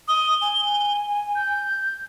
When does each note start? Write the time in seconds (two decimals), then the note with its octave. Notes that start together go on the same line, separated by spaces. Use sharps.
0.08 D#6 G7
0.42 G#5
1.35 G6